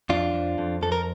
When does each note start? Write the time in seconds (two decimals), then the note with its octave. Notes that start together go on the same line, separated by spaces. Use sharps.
0.09 F2 D4 F4
0.33 F2
0.58 F2
0.82 F2 A4
0.92 A#4